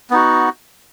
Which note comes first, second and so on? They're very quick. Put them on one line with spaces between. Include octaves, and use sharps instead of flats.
B3 D#4 F#4